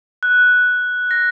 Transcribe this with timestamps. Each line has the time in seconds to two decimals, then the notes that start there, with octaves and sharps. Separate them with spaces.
0.23 F#6
1.11 A#6